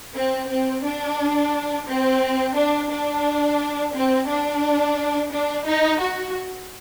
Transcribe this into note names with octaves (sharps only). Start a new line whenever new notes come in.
C4
C4
D4
C4
D4
D4
C4
D4
D4
D#4
F#4